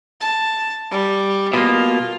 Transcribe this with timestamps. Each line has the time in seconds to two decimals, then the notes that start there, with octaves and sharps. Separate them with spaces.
0.21 A5
0.91 G3
1.54 B2 A#3 F4